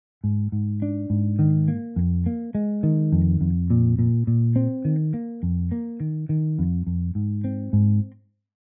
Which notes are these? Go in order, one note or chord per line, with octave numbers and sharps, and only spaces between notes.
G#2
G#2
D4
G#2
D#3
A#3
F2
A#3
G#3
D#3
F2
F2
A#2
A#2
A#2
C4
D#3
A#3
F2
A#3
D#3
D#3
F2
F2
G#2
C4
G#2